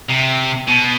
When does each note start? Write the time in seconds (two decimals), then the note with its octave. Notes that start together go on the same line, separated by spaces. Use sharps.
0.09 C3
0.68 B2